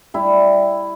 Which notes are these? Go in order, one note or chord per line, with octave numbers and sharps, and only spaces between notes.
G3 E4